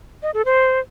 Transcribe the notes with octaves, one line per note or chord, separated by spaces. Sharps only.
D#5
A4
C5